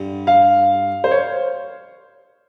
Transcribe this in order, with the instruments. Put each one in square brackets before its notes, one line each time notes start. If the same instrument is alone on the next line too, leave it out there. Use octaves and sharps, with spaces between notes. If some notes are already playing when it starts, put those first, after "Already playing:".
Already playing: [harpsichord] G2 D3 G3
[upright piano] F5
C5
C#5